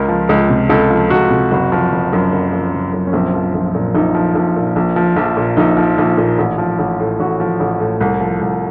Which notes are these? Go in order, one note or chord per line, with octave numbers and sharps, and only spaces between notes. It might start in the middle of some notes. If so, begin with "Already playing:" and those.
Already playing: C#2 A#4
F3
C#2
C3
C#2 A4
F3
C#2 F#4
C3
F#1 F#4
F3
F#1
F#2
F#1
F3
F#1
F#2
C#4
A#1 C4
F3
A#1
A#2
A#1 D#4
F3
A#1
A#2
A#1
F3
A#1
A#2
A#1 D#4
F3
A#1
A#2
A1
F3
A1
A2
A1 F#4
F3
A1
A2
C2
F3
C2